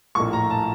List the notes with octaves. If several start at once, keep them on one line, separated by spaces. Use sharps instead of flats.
A#1 A2 F3 A#3 C#6
A#5
A5